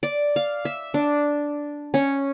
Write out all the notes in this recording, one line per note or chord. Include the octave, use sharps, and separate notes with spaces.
D5
F5
E5
D4
C#4